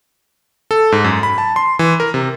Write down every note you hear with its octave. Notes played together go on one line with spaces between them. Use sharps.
A4
G#2
F#2
B5
A5
C6
E3
A#4
C3